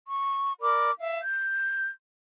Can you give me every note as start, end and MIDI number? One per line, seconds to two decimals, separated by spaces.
0.06 0.51 85
0.60 0.90 70
0.60 0.90 74
0.60 0.90 83
0.60 0.90 86
0.98 1.20 76
0.98 1.20 77
1.21 1.91 91